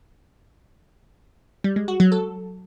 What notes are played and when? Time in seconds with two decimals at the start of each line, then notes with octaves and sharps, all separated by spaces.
1.64 G3
1.76 G#3
1.88 F#4
2.00 F#3
2.12 A4